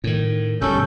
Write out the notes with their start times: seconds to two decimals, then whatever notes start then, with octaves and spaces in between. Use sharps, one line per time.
0.04 A2 D#3
0.61 G1 B2 G3 C#4 A4 G6